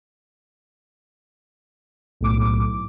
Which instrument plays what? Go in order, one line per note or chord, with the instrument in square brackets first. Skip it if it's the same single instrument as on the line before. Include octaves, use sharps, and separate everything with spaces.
[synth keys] B1 A2 D6